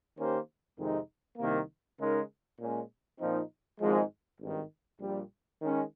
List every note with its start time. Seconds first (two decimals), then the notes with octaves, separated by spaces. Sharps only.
0.18 D#3 A#3 C#4 G4 C5
0.78 F2 C3 D#3 G#3 D#4
1.38 C2 C3 D#3 A#3
1.99 C#3 G#3 D#4 A#4
2.60 A#2 G#3 C#4
3.20 A#2 F3 C4 D#4
3.80 G#1 G#2 F3 G#3
4.40 G#1 G2 D#3
5.00 A#1 A#2 G3
5.61 D#3 G#3 C#4